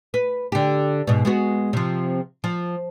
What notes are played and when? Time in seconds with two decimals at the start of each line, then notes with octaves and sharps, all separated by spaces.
0.14 B4
0.52 D3 G4
1.07 G#2 B2
1.25 G#3 B3 F#4
1.73 C3 F3
2.44 F3